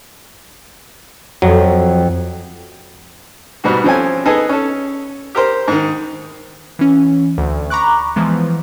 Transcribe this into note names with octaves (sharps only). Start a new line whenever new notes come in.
F2 F#3
G#2 B2 G3 B3 F#4
F3 C4 C#4 A4 G#5
B3 D#4 G#4 A4 B4 G#5
C#4 A4
G4 A#4 C5
G#2 D#3
E3 C#4
D2
A#5 B5 C#6 D6 F#6
E3 F3 G#3 B3